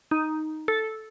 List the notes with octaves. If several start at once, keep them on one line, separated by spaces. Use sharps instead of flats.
D#4
A4